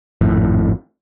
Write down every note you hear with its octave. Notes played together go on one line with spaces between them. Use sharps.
G#1 F2 A2